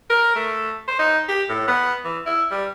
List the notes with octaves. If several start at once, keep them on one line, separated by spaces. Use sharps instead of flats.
A#4
A3
C5
D#4
G4
A2
B3
E3
E4
G3